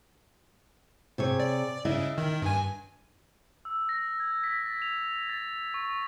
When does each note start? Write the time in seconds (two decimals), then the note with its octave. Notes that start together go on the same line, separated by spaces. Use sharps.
1.18 C3 G#4 C#5
1.40 D5
1.85 C#3 E4 D#5
2.18 D#3
2.42 G2 G#5
3.65 E6
3.89 A#6
4.20 G#6
4.44 B6
4.66 A6
4.82 F7
5.29 A6
5.74 C#6